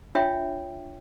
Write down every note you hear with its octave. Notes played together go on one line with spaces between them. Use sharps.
D4 F4 C#5 E5 G5